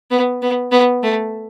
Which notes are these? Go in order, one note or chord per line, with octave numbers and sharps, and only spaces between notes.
B3
B3
B3
A3